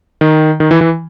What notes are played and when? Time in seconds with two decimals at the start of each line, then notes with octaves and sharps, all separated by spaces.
0.21 D#3
0.60 D#3
0.71 E3
0.81 E3